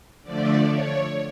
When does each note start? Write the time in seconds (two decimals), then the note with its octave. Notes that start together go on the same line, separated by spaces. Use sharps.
0.23 D3 F3 A3 D5
0.68 C#5